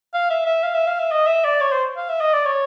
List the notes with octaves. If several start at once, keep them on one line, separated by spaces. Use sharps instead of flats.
F5
E5
E5
F5
E5
F5
E5
D#5
E5
D5
C#5
C5
F5
E5
D#5
D5
C#5